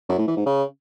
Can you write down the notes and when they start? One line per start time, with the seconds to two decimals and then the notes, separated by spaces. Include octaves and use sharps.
0.09 F#2
0.18 A2
0.28 E3
0.37 G#2
0.46 C#3